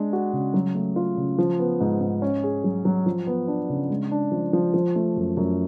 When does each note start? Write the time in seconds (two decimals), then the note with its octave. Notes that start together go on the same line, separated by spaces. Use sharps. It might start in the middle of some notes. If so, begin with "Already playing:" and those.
Already playing: G#3 D4
0.13 F#4
0.33 C#3
0.54 F#3
0.75 A3
0.96 F4
1.17 C#3
1.39 F3
1.59 B3
1.80 G#2
2.01 G#2
2.22 C#4
2.44 G#4
2.64 F#3
2.85 F#3
3.06 F3
3.27 B3
3.48 D4
3.69 C#3
3.90 G#3
4.11 D4
4.32 F3
4.53 F3
4.74 F3
4.96 A3
5.17 F#2
5.37 F#2